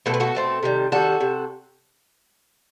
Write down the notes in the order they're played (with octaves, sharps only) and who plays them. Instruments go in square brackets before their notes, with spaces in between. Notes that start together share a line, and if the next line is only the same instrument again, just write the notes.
[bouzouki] B2 A3 C4 A4
B4
F#4 A4
B2 A3 C4
C3 D#3 G3
C3 D#3 G3 F#4 A4
C3